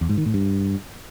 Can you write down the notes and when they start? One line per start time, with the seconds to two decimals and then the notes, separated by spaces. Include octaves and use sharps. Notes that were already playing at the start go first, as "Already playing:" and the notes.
0.01 E2
0.09 G#2
0.18 D#3
0.26 A2
0.34 G2